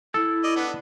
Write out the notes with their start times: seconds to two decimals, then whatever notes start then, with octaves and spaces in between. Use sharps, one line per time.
0.14 E4 A4
0.43 D5 D#5
0.56 B3 D4